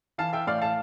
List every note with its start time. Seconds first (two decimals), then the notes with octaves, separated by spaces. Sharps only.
0.18 E3 F5 A5
0.33 E5 G5
0.47 A2 D5 F5
0.61 F5 A5